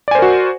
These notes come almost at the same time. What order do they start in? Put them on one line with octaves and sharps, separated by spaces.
D5 G#5 C5 A#4 F#4